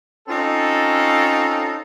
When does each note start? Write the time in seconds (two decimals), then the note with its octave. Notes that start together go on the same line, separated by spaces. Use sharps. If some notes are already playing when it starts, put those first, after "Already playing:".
0.28 C4 C#4 D#4 F4 A4